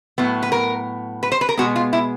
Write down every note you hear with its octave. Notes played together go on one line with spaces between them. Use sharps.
A2 F#3 B3
B4
A#4
B4
C5
B4
A#4
B2 G#3 B3 F#4
F4
E4